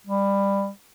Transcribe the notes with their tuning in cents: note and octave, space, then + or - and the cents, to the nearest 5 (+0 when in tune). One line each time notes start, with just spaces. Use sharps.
G3 +20